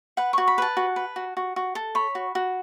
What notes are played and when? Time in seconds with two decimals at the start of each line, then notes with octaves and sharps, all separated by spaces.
0.17 B4 F#5
0.33 F#4 C#6
0.48 B5
0.58 B4 A5
0.77 F#4
0.96 B4
1.16 F#4
1.37 F#4
1.56 F#4
1.75 A4
1.95 C#5 B5
2.15 F#4
2.35 F#4